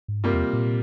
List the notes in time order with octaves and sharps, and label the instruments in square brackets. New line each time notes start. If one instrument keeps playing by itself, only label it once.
[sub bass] G#2
[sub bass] G2 [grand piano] C3 G3 A#3 F4
[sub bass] E2
A#2